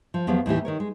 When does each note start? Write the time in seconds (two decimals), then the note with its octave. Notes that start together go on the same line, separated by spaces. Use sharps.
0.14 F3
0.27 E2 F3 F#3 B3 G4 F5
0.46 D#2 A2 E3 G4
0.65 D#3 A#4 C#5
0.80 G#3